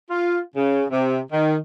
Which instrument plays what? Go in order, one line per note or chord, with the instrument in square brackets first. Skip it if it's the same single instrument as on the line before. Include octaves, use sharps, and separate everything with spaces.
[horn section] F4
C#3
C3
D#3